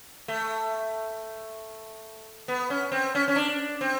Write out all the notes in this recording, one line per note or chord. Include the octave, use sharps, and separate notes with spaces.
A3
B3
C#4
C4
C#4
C#4
D4
C4